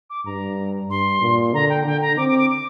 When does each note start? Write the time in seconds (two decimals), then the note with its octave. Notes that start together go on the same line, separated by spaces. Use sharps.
0.10 D6
0.26 G2 A#5
0.89 G2 C6
1.22 A#2
1.54 D3 A#5
1.69 G5
1.86 D3 G5
2.02 A#5
2.17 C4 D6
2.29 D6
2.39 D6
2.50 D6